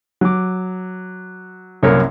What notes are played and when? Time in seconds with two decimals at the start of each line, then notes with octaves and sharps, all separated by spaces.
0.21 F#3 D6
1.83 C2 F#2 A#3 A#4 C#5